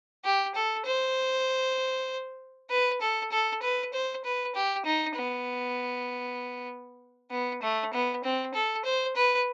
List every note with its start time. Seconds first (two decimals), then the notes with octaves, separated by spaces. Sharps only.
0.25 G4
0.55 A4
0.86 C5
2.70 B4
3.01 A4
3.31 A4
3.62 B4
3.93 C5
4.24 B4
4.55 G4
4.85 D#4
5.16 B3
7.31 B3
7.62 A3
7.93 B3
8.23 C4
8.54 A4
8.85 C5
9.16 B4